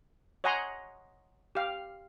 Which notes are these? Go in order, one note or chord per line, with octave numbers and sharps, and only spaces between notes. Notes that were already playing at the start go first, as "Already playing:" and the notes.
C#5 D#5 F#5 G#5 A#5 C6
G4 F5